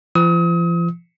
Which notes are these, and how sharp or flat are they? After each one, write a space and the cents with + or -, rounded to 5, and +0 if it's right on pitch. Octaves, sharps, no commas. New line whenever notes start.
F3 -40 D#6 +35